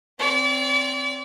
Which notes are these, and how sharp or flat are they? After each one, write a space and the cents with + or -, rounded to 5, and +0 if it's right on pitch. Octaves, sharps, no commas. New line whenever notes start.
C4 +0 D5 -40